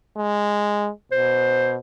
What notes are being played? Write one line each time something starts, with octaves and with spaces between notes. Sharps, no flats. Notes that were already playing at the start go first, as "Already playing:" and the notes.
G#3
B2 C5